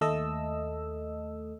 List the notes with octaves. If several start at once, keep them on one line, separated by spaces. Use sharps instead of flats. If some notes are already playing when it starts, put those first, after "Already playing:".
D#2 A3 A4 D#5 E6